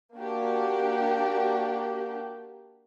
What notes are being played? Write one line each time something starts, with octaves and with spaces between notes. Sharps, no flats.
A#3 D4 F#4 G4